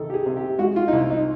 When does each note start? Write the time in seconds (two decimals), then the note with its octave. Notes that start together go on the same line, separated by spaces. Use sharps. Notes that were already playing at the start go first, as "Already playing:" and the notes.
Already playing: C2 D#3 A4
0.10 G4
0.14 G#4
0.26 C3
0.37 G4
0.58 G#3 F#4
0.76 F4
0.88 D#4
0.92 C2 E4
1.10 D#4